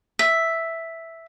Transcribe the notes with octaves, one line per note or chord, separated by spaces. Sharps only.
E5